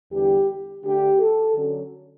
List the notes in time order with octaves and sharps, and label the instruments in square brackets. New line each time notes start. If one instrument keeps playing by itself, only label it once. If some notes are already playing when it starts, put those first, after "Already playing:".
[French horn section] E2 D3 G3 G4
D3 A3 D4 G4
A4
D3 F#3 C#4